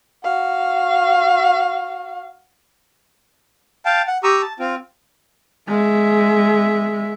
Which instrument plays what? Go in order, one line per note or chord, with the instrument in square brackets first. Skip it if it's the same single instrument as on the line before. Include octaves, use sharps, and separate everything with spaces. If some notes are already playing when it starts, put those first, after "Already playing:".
[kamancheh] F#4 F5
[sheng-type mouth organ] F5 G5 A5
F#5
G4 A#5 C#6 D#6 E6
A5
C4 F4
[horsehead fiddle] G#3 E5